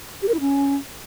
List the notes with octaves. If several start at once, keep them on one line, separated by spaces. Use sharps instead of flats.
G4
A#4
E4
C#4